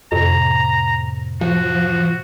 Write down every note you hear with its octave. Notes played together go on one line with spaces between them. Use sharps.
F2 A2 C3 A#5
F3 F#4